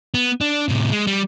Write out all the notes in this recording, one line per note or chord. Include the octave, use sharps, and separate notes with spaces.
B3
D4
A2 C3
G#3
G3